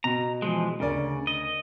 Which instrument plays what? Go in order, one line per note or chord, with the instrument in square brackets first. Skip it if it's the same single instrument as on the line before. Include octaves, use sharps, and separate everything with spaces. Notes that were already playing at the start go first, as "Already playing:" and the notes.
[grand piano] B2 [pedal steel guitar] A#5
[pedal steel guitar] E3 F3 G#3
[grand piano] D2 A#4 D5 [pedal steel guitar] C#3
[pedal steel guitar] D#5